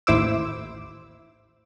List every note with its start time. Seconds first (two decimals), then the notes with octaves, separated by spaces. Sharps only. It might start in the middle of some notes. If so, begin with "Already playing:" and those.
0.07 A1 D#2 E4 C5 D6 E6